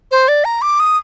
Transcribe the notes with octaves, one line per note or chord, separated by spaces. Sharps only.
C5
D5
A#5
D6
D#6